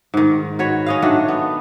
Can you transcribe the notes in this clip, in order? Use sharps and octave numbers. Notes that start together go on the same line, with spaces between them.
G#2 D#3
F#4 B4 C#5
C#4 D#5 F5
D#3 A3 D4 F#4
B3